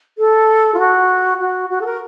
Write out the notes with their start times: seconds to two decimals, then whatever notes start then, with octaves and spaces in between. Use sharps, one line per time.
0.18 A4
0.74 F4
0.79 F#4
1.40 F#4
1.70 F#4
1.81 A4
1.86 A#4